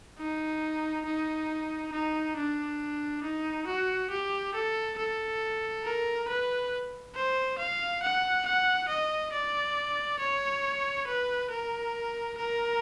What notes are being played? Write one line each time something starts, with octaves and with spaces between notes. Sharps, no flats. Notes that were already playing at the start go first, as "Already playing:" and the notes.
D#4
D#4
D#4
D4
D#4
F#4
G4
A4
A4
A#4
B4
C5
F5
F#5
F#5
D#5
D5
C#5
B4
A#4
A#4